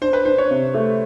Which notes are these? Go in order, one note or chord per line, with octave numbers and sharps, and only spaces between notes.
D4 C5
B4
D4 C5
C#5
C3
A3